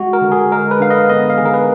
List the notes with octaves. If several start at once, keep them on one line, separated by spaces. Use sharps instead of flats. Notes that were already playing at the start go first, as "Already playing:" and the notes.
Already playing: G#3 F#4
A#4
D3
G#4
G#3 A#4
B4
D3 F5
D#5
B3 D#5
F5
D#3 G#4
A#4
B4